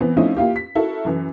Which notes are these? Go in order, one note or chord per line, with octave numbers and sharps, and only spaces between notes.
E3 B3 C4
F3 A3 C4 C#4 D#4 E4
A#3 E4 F4 G4
B6
E4 F#4 A4 A#4
F#2 E3